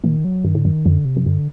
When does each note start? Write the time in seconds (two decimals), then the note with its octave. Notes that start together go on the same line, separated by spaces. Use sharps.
0.04 A#2 D#3
0.25 F#3
0.44 G2 D#3
0.55 A2 D3
0.65 G2 D#3
0.86 F#2 D3
1.05 C3
1.16 F#2
1.26 G2 D3